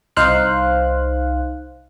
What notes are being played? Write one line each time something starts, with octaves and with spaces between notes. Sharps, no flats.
C2 D#4 C5 F5 F#6